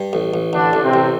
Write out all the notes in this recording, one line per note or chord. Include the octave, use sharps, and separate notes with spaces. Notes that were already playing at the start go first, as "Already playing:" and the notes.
Already playing: G2
A1
A1
A1 D3 D4
A1
C3 C4
A1